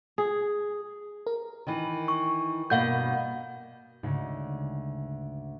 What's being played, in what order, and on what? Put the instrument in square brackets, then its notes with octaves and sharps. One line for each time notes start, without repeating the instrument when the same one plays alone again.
[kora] G#4
[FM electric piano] A#4
[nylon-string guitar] D#3 E3
[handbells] C#6
[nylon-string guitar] G2 B2 A#3 [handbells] F5 F#5 G6
[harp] D2 G#2 C#3